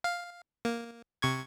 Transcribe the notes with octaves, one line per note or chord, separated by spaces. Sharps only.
F5
A#3
C3 C#6 G#6